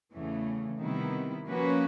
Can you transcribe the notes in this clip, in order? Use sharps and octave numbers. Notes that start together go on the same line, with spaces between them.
E2 C#3 E3 A3
C3 D#3 G3 B3 E4
F3 A#3 C#4 F#4 B4